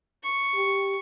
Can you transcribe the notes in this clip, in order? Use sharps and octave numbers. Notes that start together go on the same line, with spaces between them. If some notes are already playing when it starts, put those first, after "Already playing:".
C#6
G4